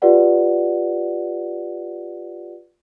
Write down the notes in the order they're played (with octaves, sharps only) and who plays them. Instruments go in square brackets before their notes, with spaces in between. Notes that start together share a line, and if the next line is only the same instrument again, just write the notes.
[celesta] F4 G4 B4 D5 F#5